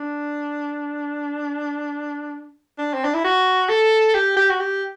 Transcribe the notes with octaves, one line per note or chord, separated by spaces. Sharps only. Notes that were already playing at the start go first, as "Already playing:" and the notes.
Already playing: D4
D4
C4
D4
E4
F#4
A4
G4
G4
F#4
G4